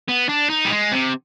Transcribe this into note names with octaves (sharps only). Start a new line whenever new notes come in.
B3
D4
D#4
G3
G#3
C3